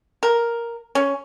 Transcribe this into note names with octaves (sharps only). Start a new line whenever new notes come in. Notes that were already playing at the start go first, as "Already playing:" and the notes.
A#4
C#4